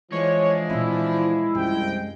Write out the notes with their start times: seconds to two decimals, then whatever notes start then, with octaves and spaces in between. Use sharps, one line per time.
0.12 E3 F3 G#3 D4 C#5
0.70 A#2 C4 E4
1.55 C2 F#2 F3 G5